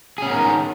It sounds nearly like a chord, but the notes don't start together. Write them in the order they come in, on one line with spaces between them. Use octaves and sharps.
G#4 C#4 B3 A#4 D#4